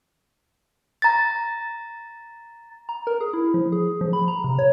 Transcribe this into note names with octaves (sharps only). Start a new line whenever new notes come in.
A#5 A6
A#5
A#4
G#4
E4
F3
G#4
F3
B5
A#5
C3
C#5